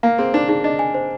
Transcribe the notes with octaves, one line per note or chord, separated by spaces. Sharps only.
A#3 F5
C4 G#4
D4 C5
D4 G#4
D4 D#5
G#5
C5